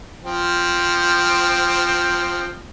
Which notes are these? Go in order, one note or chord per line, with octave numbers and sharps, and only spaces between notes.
F3 C4